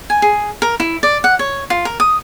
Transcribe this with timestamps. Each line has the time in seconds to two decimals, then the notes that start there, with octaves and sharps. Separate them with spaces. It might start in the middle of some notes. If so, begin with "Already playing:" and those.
0.10 G#5
0.22 G#4
0.62 A#4
0.80 E4
1.03 D5
1.24 F#5
1.39 C#5
1.70 F4
1.85 A#4
2.00 D#6